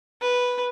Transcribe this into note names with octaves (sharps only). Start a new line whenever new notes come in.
B4